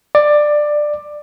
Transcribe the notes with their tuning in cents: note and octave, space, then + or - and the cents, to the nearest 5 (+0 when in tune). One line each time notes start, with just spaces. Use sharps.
D5 +15